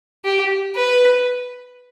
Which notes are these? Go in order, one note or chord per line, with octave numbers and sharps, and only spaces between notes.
G4
B4